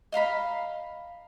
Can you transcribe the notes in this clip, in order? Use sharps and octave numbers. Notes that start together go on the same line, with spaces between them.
D#5 F5 A#5 B5